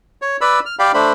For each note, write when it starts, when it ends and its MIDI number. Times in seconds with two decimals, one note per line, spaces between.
0.22 0.37 73
0.41 0.60 71
0.41 0.60 74
0.41 0.60 83
0.41 0.60 88
0.66 0.75 89
0.79 0.92 67
0.79 0.92 74
0.79 0.92 77
0.79 0.92 79
0.79 0.92 83
0.94 1.13 57
0.94 1.13 62
0.94 1.13 72
0.94 1.13 83